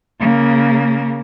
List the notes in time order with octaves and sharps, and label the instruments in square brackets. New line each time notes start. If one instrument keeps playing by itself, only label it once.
[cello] C#3 A#3